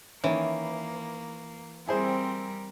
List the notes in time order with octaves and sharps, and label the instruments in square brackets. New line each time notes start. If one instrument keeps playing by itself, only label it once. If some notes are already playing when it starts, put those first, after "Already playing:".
[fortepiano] D#3 C#4 [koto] E3 [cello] A#3
[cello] G3 A#4 [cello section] C4 [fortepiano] E4 G#4 C5